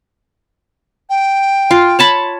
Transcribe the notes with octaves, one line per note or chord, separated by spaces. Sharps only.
G5
F4
C#5 A5 B5